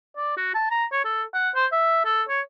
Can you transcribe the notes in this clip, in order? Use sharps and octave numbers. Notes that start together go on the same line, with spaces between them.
D5
F#4
A5
A#5
C#5
A4
F#5
C5
E5
A4
C#5